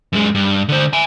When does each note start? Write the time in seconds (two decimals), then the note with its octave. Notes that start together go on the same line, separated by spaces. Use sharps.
0.13 F#2 G#3
0.35 G2
0.69 D3 C5
0.93 E5 G#5